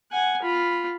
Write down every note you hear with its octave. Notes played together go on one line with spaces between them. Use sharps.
F#5 G#5
F4 B5